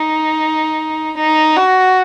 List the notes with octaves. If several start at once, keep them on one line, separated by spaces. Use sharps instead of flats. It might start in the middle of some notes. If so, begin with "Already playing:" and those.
Already playing: D#4
D#4
F#4